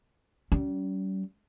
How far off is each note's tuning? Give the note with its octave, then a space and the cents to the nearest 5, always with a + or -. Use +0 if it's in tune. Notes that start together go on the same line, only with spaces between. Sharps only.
G3 -40 C#4 +25